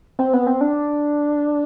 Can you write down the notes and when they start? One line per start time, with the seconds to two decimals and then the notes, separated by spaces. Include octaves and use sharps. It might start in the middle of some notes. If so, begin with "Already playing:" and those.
0.19 C4
0.33 B3
0.47 C4
0.61 D4